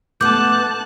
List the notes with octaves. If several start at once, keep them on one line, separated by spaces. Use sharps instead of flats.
A3 B3 A5 D6 F#6 G6